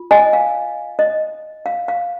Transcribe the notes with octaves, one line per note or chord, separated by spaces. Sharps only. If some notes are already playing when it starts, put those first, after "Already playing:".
Already playing: F4
D#5 G#5
F5
D#5
F5
F5